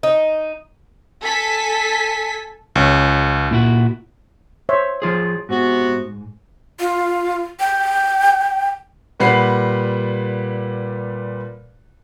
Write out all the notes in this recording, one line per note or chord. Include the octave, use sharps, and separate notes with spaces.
D#4
A4 G#5 B6
C#2 C#4
A#2 E4 F#4
C5 C#5 E5
F3 F4 G#4
G#2 C3 B3 F#4
F4
G5
A#2 G3 B4 F#5 C7